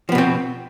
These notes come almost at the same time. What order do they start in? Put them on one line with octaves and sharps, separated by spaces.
F3 B3 B2 C4